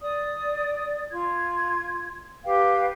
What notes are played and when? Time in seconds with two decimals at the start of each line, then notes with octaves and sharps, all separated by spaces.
0.02 D5 D#6
1.11 F4 G#6
2.45 G4 B4 F5 G5